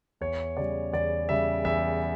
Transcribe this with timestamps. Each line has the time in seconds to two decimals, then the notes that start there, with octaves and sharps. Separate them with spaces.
0.21 E2 C#5
0.57 C#3 G3 D5
0.92 E2 D5
1.29 C#3 G3 E5
1.65 E2 E5